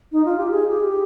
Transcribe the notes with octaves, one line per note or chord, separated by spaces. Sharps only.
D#4
F4
G4
G#4
G4